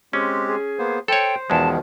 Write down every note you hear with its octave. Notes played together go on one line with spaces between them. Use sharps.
G#3 C4 C#4 G4
G#4
A#3 B3 C5
A4 C5 C#5 G5
E2 B2 D#3 F3 G#3 A5